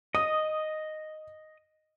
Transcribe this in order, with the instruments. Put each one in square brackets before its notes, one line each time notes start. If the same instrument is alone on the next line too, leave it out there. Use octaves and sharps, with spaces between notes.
[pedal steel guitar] D#5 [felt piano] D#6